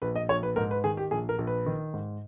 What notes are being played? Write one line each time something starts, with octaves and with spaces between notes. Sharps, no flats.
A#1 B4
D#5
A#1 C#5
B4
G#2 A#4
B4
D#3 G#4
G4
A#1 G#4
A#4
A#1
B4
D#3
G#2